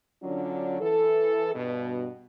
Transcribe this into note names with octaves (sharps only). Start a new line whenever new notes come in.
D3 F#3 C#4 D4 F4
E3 A4
G2 B2